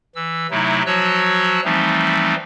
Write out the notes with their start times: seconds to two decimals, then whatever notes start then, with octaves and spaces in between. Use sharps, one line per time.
0.15 E3 E6
0.51 C3 F#3 A3 D#4 E4
0.86 F3 F#3 F#4 C#5 E6 F#6
1.64 E3 F3 G3 A3 C4 D#4